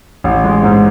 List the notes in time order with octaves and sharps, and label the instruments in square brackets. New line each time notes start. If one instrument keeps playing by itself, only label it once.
[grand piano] A1
G#3
G#2